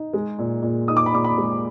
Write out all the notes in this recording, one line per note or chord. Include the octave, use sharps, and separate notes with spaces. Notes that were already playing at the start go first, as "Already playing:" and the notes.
Already playing: D#4
G#3
A#2
A#2
D#4 D#6
D6
B5
A#2 D6
B5
G#3